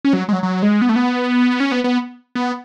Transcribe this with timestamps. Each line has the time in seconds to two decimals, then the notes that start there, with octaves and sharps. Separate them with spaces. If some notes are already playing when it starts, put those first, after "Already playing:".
0.05 C#4
0.13 F#3
0.29 G#3
0.33 F#3
0.43 F#3
0.63 G#3
0.82 B3
0.89 A3
0.96 B3
1.60 C#4
1.72 B3
1.84 B3
2.35 B3